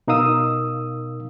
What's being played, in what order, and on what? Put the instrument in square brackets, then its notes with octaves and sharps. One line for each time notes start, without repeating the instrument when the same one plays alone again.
[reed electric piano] B2 D#4 A#4 F5 D#6 E6